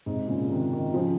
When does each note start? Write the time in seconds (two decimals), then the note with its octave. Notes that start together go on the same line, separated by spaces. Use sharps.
0.06 G#2 C3
0.28 A#2 C#3
0.50 C3 D#3
0.71 C3 D#3
0.94 C#3 F3